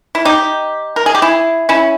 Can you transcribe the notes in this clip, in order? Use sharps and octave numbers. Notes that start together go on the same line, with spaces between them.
E4
D#4 G4
A#4
G#4
G4
E4 G#4
C#4 E4